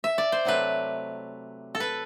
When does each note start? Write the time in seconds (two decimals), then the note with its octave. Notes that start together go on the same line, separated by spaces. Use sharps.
0.04 E5
0.18 D5
0.32 C5
0.45 C3 F#3 A3 B4
1.75 A4
1.80 B4